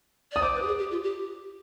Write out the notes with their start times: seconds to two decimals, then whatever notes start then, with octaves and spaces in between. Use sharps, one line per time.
0.32 D5 D#6
0.42 C5 D6
0.54 B4
0.62 G4
0.67 G#4
0.79 G4
0.91 F4
1.03 G4